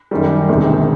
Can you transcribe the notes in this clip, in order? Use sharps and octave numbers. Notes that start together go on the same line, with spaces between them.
F#2 D#3 G3
E1 D2 C3 D#3